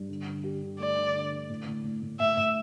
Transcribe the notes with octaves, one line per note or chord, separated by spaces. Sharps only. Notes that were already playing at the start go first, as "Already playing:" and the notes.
Already playing: G2
D3
D3
G4
D3
A3 D5
D3
D3
D3
A2
A2
A2
A2
A2 E5
A2